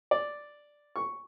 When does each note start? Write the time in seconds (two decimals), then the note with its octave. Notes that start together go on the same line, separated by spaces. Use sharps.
0.11 D5
0.96 C#6